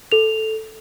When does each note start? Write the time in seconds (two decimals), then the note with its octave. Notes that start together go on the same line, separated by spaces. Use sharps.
0.12 A4 F7